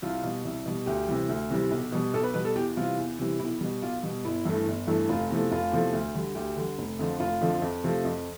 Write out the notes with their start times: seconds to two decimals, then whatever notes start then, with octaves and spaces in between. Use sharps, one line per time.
0.02 C2 F4
0.23 B2 G3
0.45 C2
0.66 B2 G3
0.86 D2 G4
1.08 C3 E3 G3
1.29 D2
1.50 C3 E3 G3
1.71 B1
1.92 B2 G3
2.14 B1 A4
2.23 B4
2.34 B2 G3 B4
2.45 A4
2.55 E2 G4
2.77 C3 E3 G3 F4
2.98 E2
3.19 C3 E3 G3
3.39 B1 E4
3.61 B2 G3
3.82 B1 F4
4.03 B2 G3
4.24 G1 E4
4.45 G2 E3 A3
4.66 G1
4.87 G2 E3 A3
5.09 F1 F4
5.30 E2 C3 F3 A3
5.52 F1 F4
5.72 E2 C3 F3 A3
5.93 D2
6.14 D3 G3
6.35 D2 G4
6.56 D3 G3
6.78 F1
6.99 F2 D3 F3
7.20 F1 F4
7.41 F2 D3 F3
7.62 F2
7.84 C3 F3 A3
8.04 F2